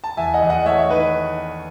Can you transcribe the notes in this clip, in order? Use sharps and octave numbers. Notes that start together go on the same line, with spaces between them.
A5
E2 E5 G#5
D#5 F#5
E2
D#5 F#5
A3 C#5 E5
C#5 E5
D#3 B4 D#5